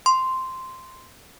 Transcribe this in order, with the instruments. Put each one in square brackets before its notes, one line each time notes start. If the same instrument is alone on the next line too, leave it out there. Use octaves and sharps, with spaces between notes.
[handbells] C6